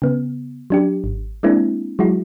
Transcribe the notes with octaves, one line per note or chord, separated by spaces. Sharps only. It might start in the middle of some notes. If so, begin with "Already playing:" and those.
C#3 B3
F#3 D4 G4
G#1
G#3 A#3 C4 D4 E4
F#3 G#3 E4 F#4